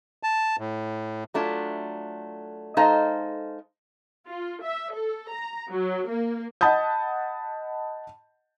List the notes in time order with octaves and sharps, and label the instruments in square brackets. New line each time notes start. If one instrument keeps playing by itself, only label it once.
[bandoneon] A5
A2
[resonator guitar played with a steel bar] F#3 A3 D4 F4
G#3 D#4 A4 C5 D#5 F5
[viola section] F4
E5
A4
A#5
F#3
A#3
[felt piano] D#5 F#5 A5 B5 D#6 G6